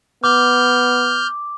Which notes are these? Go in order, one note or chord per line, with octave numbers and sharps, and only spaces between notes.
B3 D6 F6 G6